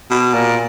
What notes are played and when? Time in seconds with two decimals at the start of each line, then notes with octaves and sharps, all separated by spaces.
0.11 B2
0.34 A#2